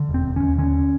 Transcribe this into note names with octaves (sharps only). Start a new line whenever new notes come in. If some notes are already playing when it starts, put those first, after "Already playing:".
Already playing: D3
E1
C4
E1
C#4
D#2
D3 C#4